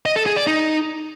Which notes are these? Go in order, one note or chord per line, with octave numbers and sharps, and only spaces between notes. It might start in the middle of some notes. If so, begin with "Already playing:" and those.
D#5
A4
G#4
D5
D#4